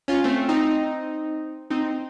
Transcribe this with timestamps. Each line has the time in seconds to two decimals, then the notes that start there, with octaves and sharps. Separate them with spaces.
0.08 C#4 F4
0.24 A3 C4
0.49 C4 D#4
1.70 C4 D#4